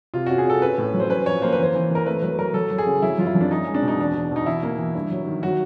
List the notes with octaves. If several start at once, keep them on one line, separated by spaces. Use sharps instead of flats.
C3 F4
C#4 F#4
G#4
C#4 A4
C#4 B4
A2
F#3
C5
C#4 B4
F3 C#5
A#3 C5
B4
E3 C5
E3
E3 A#4
A3 B4
F#3 B4
F#3 A#4
F#3 A4
F#3
G#4
C#3
F#3 E4
F#2 F4
E4
F#2
D4
C#4 D#4
G#3
D4
B2
D#4
E2 D4
E2
B2 D#4
E3 E4
A#3
E3
G2
F#3
D#3
F#3 F#4